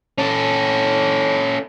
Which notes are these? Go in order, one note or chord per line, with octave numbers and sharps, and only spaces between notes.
C#4 A4